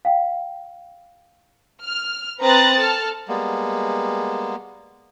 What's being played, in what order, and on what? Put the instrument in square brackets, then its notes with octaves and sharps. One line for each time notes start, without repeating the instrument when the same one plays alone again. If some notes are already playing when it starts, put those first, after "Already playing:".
[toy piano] F5 G5
[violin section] F6
C4 B4 A#5 D#6 F#6 A6
A4 A5 F6
[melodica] G3 G#3 A#3 B3